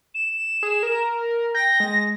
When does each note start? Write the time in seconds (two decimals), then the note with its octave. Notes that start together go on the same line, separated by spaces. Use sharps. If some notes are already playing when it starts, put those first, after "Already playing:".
0.15 E7
0.63 G#4
0.83 A#4
1.55 G5 A#6
1.80 G#3